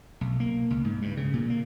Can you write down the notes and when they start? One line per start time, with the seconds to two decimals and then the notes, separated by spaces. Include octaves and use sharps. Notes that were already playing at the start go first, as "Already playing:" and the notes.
0.21 B1
0.40 A#3
0.70 C#2
0.85 G#2
1.02 G2
1.17 C#3
1.34 A#2
1.50 A#3